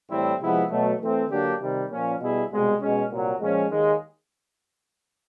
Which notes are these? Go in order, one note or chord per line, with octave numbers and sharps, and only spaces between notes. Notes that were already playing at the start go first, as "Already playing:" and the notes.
A2 E3 G3 C4 E4
C3 F3 G#3 B3 E4
B2 F#3 A3
E3 A3 C4
D3 F#3 A#3 D4 G4
C3 D#3 G3
A#2 F3 A#3 C#4
B2 G3 B3 E4 G#4
C2 B2 G#3
B2 G#3 C#4
C2 A#2 F#3
A#2 F3 G#3 C#4
D#2 D#3 G#3